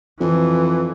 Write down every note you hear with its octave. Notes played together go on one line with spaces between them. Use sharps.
F2 E3